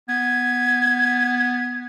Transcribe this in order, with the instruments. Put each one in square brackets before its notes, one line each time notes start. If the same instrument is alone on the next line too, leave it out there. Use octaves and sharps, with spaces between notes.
[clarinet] B3 [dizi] G#6